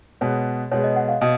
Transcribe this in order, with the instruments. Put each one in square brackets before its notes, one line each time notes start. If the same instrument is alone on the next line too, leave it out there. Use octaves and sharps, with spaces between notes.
[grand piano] B2 G#3 B3 [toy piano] C#5
[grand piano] B2 G#3 B3 [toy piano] C#5
[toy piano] D#5
F#5
F5
[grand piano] B2 [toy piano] D#5